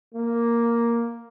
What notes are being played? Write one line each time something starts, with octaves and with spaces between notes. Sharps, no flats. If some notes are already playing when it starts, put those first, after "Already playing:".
A#3